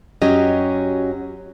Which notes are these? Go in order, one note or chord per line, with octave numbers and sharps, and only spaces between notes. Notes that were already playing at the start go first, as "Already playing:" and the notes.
F#2 F#3 C#4 G4 D#5